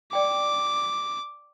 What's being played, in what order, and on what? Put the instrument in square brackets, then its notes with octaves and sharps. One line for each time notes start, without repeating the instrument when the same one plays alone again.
[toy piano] D5 G5 [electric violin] D6